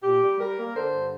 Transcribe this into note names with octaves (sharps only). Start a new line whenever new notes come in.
A#2 G4
G3
G3 A#4
A#3
D3 C5
G2